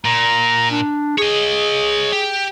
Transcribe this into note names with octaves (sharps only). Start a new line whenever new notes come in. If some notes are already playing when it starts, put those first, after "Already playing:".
A#2 A#5
D4
G#4 C#5 D#5
G4